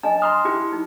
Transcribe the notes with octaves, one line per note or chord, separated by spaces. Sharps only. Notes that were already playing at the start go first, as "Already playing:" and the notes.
D4 D#5 G#5 A5
A#5 C6 D#6 F6
E4 G4
D#4